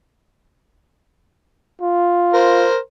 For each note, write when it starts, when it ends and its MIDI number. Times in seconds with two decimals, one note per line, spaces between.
1.81 2.68 65
2.34 2.77 70
2.34 2.77 72